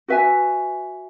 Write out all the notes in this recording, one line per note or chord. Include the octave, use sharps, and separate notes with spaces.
F#4 B4 E5 G#5